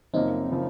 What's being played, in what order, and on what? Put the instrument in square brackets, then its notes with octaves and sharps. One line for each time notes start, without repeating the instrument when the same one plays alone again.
[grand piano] F#2 C#3 F3 A#3 [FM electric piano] C4 D#4
[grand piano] C#3 F3 A#3